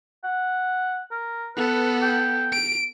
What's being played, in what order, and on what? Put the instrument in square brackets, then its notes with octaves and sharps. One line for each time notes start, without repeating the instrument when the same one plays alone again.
[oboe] F#5
A#4
[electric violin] B3 A4 [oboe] B4
[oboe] G5
[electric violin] D7